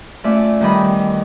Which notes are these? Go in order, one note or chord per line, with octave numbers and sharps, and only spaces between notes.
A3 C#4 F4 D5 E5
E2 D#3 G3 D#5 B5